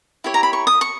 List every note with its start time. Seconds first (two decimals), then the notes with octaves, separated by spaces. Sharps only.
0.24 E4 G4 C#5
0.34 A#5
0.43 B5
0.53 C#6
0.67 D#6
0.81 C#6